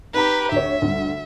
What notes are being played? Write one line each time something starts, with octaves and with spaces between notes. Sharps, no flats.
D#4 G4 B4 A#5
D2 C#5 E5
D2 G2